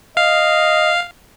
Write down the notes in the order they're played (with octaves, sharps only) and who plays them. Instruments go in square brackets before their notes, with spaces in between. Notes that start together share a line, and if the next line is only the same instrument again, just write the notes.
[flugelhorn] D#5 [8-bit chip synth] F5